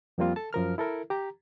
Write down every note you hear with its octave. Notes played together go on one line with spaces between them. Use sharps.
F2 F3 G3 A#3 C4 F4
A4 A5
F#2 F3 A#4 F6
E4 A4 A#4
G4 A#5